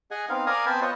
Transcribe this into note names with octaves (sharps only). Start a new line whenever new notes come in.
G#4 D#5 F#5 G#5
B3 C4 D#4 F5
A#4 D5 F5 G#5 A#5 D#6
B3 C4 C5 G#5 A5 B5
B3 F4 C5 C#5 D#5 F#5